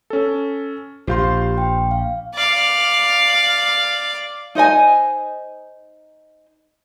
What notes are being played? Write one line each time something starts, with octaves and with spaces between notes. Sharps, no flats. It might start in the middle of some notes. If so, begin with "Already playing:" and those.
C#4 A4
A#1 F4 G4 C5 F5 C6 G6
G5
F5
D5 F5
D#4 C5 D#5 G#5